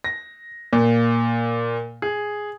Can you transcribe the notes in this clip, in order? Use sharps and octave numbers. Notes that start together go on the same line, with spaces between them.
A#6
A#2
G#4